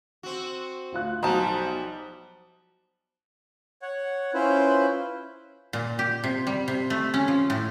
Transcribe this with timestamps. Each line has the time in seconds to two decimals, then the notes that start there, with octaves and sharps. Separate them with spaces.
0.23 C4 F#4
0.92 D2 F4 F#6
1.23 B1 F3 G3 C5 A5 A#5 D#6
3.82 C#5 F#5
4.34 C#4 E4 F4 B4 C5
5.73 A#2
5.99 G4
6.24 C3
6.47 G3
6.68 C3
6.90 A3
7.14 C#4
7.28 F3
7.50 A2